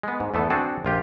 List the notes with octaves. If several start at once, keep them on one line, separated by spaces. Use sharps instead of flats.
G#3 B3
G#2
E2 A3 B3 A4
C4 D4 F#4 G#4 A4 A5
A#1 F4 G4